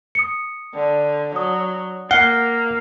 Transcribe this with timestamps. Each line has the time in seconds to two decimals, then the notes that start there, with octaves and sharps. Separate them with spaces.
0.15 D#6 C#7
0.74 D3
1.36 F#3 D#6
2.11 A#3 F5 F#5 G7